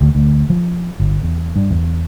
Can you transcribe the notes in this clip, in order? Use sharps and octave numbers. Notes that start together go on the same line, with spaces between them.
D2
D2
F3
G1
E2
G2
E2